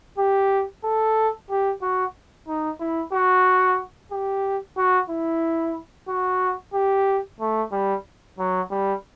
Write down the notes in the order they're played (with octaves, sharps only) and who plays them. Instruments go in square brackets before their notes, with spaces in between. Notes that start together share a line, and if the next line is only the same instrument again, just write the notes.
[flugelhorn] G4
A4
G4
F#4
D#4
E4
F#4
G4
F#4
E4
F#4
G4
A3
G3
F#3
G3